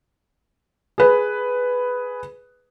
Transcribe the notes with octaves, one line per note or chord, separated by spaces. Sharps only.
G#4 B4